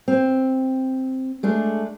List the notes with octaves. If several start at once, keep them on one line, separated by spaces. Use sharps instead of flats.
C4
G#3 A3 D4